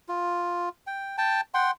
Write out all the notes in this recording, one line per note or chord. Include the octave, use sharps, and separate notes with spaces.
F4
G5
G5 A5
F#5 G5 C6